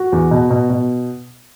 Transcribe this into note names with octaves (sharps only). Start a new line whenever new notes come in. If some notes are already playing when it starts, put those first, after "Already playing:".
Already playing: F#4
E2
B2
B2
B2